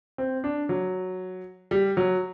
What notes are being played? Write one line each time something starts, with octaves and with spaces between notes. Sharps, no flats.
C4
D4
F#3
G3
F#3